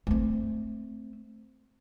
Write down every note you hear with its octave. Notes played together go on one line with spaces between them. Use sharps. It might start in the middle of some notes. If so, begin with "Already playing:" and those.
A3 C4